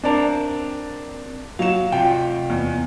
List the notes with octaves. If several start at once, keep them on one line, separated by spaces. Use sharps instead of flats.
C4 D4 A#4 D5 A5
F#3 F5 E7
C3 F4 G5
E2